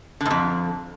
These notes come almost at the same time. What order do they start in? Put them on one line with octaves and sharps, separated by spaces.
D3 G#2 F2